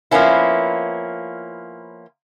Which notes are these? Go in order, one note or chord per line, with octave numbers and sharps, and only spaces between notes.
F3 A#3 B3 C#4 E4